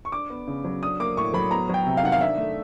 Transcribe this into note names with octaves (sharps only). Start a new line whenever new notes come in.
C#6
D4 D6
B3
C#3
F#3
D4 D#6
A#3 D6
A2 C#6
F#3 B5
B3 A#5
F#3 G5
C3
F5
D#3 F#5
F5
D4 E5
A3